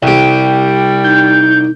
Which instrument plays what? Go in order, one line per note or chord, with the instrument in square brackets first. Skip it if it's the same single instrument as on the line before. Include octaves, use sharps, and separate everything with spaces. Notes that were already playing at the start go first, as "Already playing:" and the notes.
[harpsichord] C2 G4 [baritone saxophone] G3
[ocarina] D#4 [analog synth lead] G6